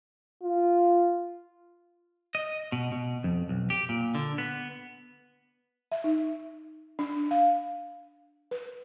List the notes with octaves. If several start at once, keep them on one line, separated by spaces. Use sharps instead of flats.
F4
D#5
B2
B2
F2
B1
G4
A#2
D3
B3
E5
D#4
D4
F5
B4